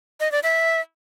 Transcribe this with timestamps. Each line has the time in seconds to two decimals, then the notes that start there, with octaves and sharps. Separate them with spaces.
0.20 D#5
0.32 D5
0.43 E5